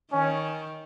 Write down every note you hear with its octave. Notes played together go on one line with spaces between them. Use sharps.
D#3 C#4